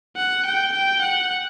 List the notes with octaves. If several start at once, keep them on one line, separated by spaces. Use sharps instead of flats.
F#5
G5
G5
F#5